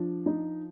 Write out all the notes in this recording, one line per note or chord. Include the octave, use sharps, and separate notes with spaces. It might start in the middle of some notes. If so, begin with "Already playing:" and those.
Already playing: F3 D4
D#4